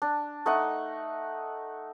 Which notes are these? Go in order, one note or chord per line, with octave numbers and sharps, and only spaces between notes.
D4
A3 D#4 D#5 F#5